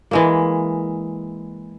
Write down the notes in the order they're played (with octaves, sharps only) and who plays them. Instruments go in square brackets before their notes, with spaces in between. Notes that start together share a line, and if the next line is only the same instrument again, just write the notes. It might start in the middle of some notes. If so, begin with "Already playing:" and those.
[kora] E3 G#3 A#3